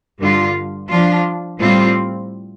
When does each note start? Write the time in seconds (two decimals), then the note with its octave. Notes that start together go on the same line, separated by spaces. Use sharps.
0.19 G2 D3 G3 F4
0.89 F3 D4 F4
1.59 A2 G3 C4 F4